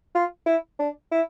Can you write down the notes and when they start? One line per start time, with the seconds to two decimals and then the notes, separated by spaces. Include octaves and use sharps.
0.15 F4
0.46 E4
0.79 D4
1.12 E4